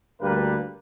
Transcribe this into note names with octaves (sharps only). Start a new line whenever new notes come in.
D2 G2 G3 A#3 A#4 B4